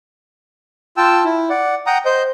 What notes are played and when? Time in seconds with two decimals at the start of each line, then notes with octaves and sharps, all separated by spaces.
0.97 F4 G5 A5 E6
1.25 E4
1.50 D5 F#5
1.87 F#5 G5 A#5 D#6
2.05 C5 D#5 G6